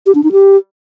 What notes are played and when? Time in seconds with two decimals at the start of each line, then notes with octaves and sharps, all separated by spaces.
0.06 G4
0.15 D4
0.23 D#4
0.32 G4